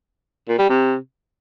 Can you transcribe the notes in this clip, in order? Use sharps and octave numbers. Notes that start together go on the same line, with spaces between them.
A#2
G3
C3